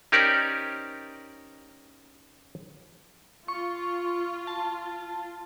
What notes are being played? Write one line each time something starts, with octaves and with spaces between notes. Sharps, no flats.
C#4 D#4 G4 A#4 C5 D5
F4 C#6
A5